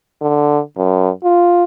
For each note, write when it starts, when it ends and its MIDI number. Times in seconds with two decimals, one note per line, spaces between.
0.21 0.59 50
0.77 1.10 42
1.24 1.64 65